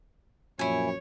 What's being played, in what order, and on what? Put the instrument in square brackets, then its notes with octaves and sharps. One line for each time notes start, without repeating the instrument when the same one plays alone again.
[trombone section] F#2 A#2 F3 [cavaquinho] E4 G#5 [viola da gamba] C#5